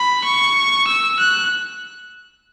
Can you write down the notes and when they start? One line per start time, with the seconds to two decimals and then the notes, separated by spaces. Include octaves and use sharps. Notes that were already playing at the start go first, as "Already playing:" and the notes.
Already playing: B5
0.24 C#6
0.87 E6
1.19 F#6